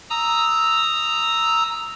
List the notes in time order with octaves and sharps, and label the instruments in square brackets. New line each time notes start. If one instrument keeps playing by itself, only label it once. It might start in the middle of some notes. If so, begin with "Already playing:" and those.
[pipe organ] A#5 D#6 E6